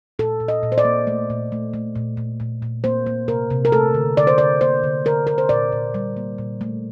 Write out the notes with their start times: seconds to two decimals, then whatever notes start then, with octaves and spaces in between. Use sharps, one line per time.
0.19 A#2 A4
0.40 A#2
0.48 D#5
0.63 A#2
0.72 C5
0.78 D5
0.85 A#3
1.07 A3
1.30 A#2
1.52 A3
1.74 A3
1.95 A#2
2.17 A#2
2.40 A#2
2.62 A#2
2.84 A#3 C5
3.06 A#3
3.28 C3 A#4
3.51 C3
3.65 A#4
3.72 A3 A4
3.94 D3
4.17 D3 D5
4.27 C5
4.38 D3 D5
4.61 A#3 C5
4.84 D3
5.05 D3 A#4
5.27 D3 A#4
5.38 C5
5.49 A#2 D5
5.72 A#2
5.94 G3
6.17 A#3
6.38 A#2
6.61 A3